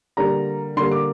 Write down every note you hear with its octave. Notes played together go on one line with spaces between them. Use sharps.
D3 G3 A#3 A#5
D3 G3 A#3 C6
D6